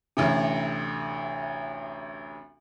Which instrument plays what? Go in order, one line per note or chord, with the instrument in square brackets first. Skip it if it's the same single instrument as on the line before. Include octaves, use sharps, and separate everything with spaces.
[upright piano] A1 D2 C3